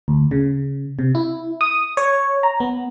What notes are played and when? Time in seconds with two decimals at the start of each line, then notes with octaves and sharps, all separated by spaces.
0.08 D2
0.31 C#3
0.99 C3
1.15 E4
1.61 D#6
1.97 C#5
2.43 A#5
2.60 B3